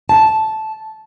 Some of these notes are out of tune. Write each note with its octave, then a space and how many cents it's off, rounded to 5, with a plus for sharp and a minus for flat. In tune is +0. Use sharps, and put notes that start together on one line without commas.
A5 -10